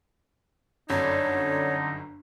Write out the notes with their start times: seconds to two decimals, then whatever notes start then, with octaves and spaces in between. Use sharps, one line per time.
0.90 G1 F#2 D3 D#4 C#5